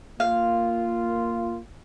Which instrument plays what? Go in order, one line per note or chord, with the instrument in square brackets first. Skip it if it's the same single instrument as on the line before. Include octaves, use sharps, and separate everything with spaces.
[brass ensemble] A#3 F4 [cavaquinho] F5